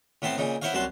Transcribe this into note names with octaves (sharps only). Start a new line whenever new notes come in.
A2 B3 C4 A5 C6
A#2 C#3 D#4
B3 E4 C5 C#5 F5
C2 F#2 F#4 A5 C6